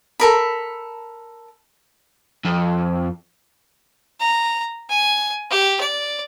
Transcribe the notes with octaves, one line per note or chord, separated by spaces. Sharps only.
A4 A#4 B5
F2
A#5
G#5
G4
D5